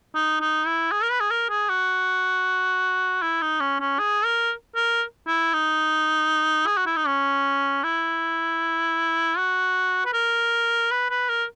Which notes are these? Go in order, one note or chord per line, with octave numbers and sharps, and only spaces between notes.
D#4
D#4
E4
G#4
A#4
B4
G#4
A#4
G#4
F#4
E4
D#4
C#4
C#4
G#4
A#4
A#4
E4
D#4
G#4
F#4
E4
D#4
C#4
E4
F#4
B4
A#4
B4
B4
A#4